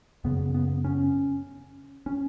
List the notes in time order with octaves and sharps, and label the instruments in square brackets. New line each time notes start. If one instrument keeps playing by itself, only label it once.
[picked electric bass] F#2 C#3 B3
B3
C#4
C#4